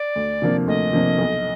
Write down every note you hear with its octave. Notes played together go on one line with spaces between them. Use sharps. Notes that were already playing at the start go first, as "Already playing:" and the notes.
Already playing: D5
D2
C3 F3 A#3 D4
D2 D#5
C3 F3 A#3 D4
B1